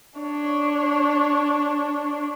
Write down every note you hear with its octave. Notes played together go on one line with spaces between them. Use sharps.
D4 C#5